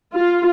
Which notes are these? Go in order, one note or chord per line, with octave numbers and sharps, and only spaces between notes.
F4